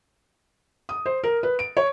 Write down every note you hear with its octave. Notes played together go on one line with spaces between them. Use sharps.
D#6
C5
A#4
B4
D7
C#5